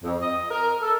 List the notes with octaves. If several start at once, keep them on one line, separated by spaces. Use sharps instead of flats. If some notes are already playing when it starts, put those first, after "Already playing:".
F2
D#5
A#4
A4